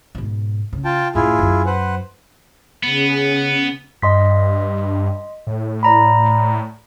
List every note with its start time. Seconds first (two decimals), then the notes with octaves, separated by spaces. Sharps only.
0.15 G#2 B2
0.73 C#3
0.85 F4 G5 A5
1.15 F#2 A2 E4 F4 G#4
1.39 F#2 F#3
1.66 B4 C5 F#5
2.83 C#3 B3 C#4 G#4
4.02 G2 D#5 C6 B6
5.47 A2
5.83 D5 A#5 B5